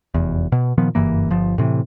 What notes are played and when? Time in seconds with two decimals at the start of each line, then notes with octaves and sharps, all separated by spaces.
0.14 F1 E2
0.52 B2
0.78 A#2 D#3 F3 B3
0.95 F#1 G2 E3 A#3
1.30 G1 F3
1.58 A2 C3 E3